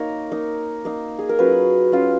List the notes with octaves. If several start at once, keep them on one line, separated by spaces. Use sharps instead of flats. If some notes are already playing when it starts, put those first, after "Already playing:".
Already playing: A#3 D#4 A#4 C#5
A#3 D#4
A#3 D#4
G#4
A#4
F#3 C#4 F4 B4
F#3 C#4 F4